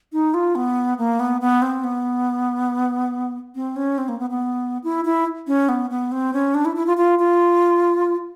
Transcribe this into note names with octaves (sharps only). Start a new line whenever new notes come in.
D#4
F4
B3
A#3
B3
B3
C4
B3
C4
C#4
C4
A#3
B3
B3
E4
E4
C#4
B3
B3
C4
C#4
D4
E4
E4
F4
F4
F4